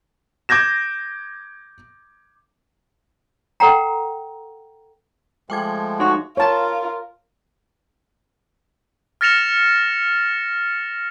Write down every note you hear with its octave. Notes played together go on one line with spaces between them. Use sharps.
D6 G6 G#6 A#6 E7
A4 B4 F#5 G5 A#5
F3 G#3 A3 G5 D6 G#6
D#4 F#4 C6
F4 A#4 C#5 A5
F6 A6 A#6 C#7 E7 F7